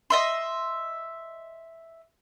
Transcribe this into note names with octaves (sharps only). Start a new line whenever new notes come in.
D#5 E5 C6